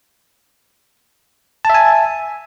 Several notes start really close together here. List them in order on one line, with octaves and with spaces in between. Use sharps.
A5 E5 G#5